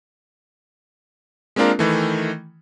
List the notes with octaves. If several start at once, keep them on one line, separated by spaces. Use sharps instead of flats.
G#3 A#3 C4 D4 F4 A#4
D#3 E3 A3